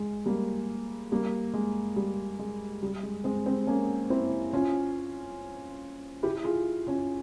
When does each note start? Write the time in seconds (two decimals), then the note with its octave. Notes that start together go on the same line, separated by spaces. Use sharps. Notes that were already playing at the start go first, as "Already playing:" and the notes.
Already playing: G#3
0.26 G3 A#3
1.12 G3 A#3
1.54 G#3
1.96 G3
2.39 G#3
2.83 G3
3.03 G#3
3.24 G#3 C4
3.46 G#3 C4
3.67 A#3 C#4
4.10 C4 E4
4.53 C#4 F4
6.23 E4 G4
6.44 F4 G#4
6.87 C#4 F4